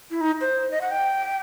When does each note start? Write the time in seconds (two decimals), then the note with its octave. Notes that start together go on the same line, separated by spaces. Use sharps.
0.11 E4
0.21 D#4
0.41 C5
0.71 D#5
0.81 F#5
0.91 G5